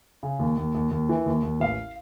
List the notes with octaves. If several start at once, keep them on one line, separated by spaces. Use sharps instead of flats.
C#3
D#2
D#2
D#2
D#2
E3
D#2
D#2
A1 F5